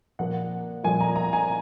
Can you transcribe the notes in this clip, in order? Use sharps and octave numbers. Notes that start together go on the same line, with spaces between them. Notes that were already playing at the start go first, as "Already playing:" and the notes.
A#2 F3 A#3 F#5
A#2 F3 A#3 G#5
A#5
A#5
G#5